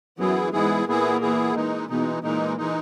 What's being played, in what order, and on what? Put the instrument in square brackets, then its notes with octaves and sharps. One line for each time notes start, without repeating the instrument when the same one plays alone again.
[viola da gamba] F#2 F#3 [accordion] E3 B3 E4 G#4
[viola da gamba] G#2 G#3 [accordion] E3 B3 E4 G#4
[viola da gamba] A#2 A#3 [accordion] E3 B3 E4 G#4
[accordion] E3 B3 E4 G#4
E3 G#3 D#4
[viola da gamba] B2 B3 [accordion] E3 G#3 D#4
[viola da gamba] A#2 A#3 [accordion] E3 G#3 D#4
[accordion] E3 G#3 D#4